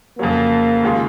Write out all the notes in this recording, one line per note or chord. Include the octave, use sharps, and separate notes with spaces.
F2 C#3 F#3 A#3
D#2 C#3 G#3 C#4 F4